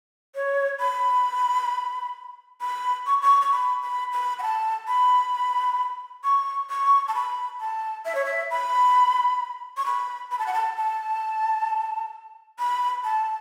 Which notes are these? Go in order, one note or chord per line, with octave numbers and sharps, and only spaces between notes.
C#5
B5
B5
C#6
C#6
C#6
B5
B5
B5
F#5
A5
B5
C#6
C#6
A5
B5
A5
E5
C#5
E5
B5
C#6
B5
B5
A5
F#5
A5
A5
B5
A5